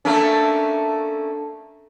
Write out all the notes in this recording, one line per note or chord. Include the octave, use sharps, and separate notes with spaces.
A3 A#3 C#4 D4 A4 A5